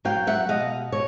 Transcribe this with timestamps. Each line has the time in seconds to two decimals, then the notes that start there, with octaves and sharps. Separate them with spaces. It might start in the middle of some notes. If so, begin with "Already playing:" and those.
0.05 F#3 F5 G5
0.27 E5 F#5
0.48 B2 D#5 F5
0.92 B2 C#5